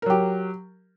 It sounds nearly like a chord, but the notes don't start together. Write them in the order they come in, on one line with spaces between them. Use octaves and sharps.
A#4 F#3 G4